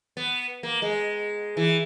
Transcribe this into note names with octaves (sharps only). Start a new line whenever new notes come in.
B3
A#3
G#3
E3